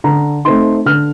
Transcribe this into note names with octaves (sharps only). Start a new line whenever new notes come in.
D3 A#5
A3 C4 D#4 C6
D3 F6